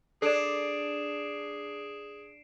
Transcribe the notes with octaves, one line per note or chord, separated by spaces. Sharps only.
D4 G#4 A4 D5 C7 D7 E7